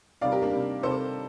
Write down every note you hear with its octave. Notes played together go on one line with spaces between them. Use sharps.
C3 D#3 G3 D5 F5
G4 A#4
A#3 D4
C3 D#3 G3
C3 D#3 G3 A4 C5